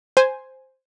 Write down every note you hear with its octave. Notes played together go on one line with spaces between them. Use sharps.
C5 G#5